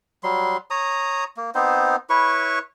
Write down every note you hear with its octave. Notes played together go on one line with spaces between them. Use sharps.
F#3 G3 C6
C#5 A#5 D#6
A#3
B3 C4 D#4 C5
E4 B4 C#5 C#6